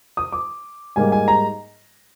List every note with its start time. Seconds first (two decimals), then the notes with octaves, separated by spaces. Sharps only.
0.17 D#6
0.32 D6
0.96 G#2 G3 A#3 G#5
1.12 G#5
1.28 A#5